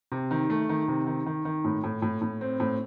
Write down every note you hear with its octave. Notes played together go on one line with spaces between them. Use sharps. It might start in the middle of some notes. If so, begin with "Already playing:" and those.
C3
D#3
A3
D#3
C3
D#3
D#3
D#3
A2
A2
A2
A2
C4
A2